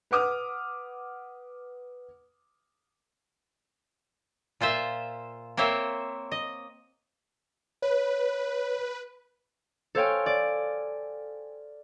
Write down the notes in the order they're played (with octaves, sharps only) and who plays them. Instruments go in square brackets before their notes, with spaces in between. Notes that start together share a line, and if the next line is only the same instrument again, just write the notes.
[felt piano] B4 F#5 D6 D#6 F6
[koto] A#2 F4 C5 E5
A#3 C4 C5 C#5 E5
D#5
[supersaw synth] B4 [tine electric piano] C#5
[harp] A4 C5 C#5 F5 G5 G#5
D5